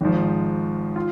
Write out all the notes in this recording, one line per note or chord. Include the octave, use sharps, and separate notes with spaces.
G#1 G#2 F3
F4